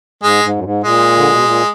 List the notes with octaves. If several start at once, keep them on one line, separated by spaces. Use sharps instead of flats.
G#2 G#3
G#2
F#2
G#2
A#2 G#3
D3
B2
A#2